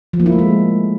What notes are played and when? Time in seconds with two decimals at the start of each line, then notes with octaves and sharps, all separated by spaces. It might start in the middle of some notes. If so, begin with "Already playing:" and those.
0.13 F3
0.20 A#3
0.26 E4
0.32 A3
0.39 G#3